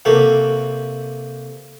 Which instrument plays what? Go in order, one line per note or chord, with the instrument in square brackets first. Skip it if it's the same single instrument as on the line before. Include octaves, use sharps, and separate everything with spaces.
[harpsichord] C3 A#3 F#4 G4 A4